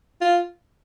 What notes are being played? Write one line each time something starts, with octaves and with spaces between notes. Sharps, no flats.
F4